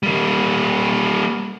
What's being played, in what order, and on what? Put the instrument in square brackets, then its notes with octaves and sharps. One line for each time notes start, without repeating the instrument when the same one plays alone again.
[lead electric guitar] G3 A#3